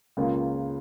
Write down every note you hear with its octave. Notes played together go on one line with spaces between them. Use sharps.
C#2 C#3 A#3 F4